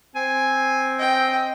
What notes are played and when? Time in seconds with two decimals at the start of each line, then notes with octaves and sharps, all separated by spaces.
0.16 C4 G#5
0.99 D#5 G5